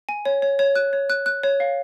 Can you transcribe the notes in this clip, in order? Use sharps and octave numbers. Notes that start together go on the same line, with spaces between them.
G#5
C#5
C#5
C#5
F#6
C#5
F#6
F#6
C#5
F5